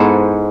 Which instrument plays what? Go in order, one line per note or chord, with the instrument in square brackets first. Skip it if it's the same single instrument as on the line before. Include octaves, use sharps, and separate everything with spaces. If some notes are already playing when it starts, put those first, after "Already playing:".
Already playing: [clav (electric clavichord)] G#2 [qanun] B3 E4 A4 C5